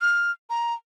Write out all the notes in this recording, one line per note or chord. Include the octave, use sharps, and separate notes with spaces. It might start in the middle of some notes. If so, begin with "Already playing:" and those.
F6
A#5